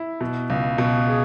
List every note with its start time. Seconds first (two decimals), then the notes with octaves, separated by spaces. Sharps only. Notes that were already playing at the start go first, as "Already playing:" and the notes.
Already playing: E4
0.21 B2
0.50 C#2
0.78 B2
1.08 G#4